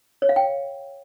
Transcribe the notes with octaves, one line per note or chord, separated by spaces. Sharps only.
C#5
F5
G5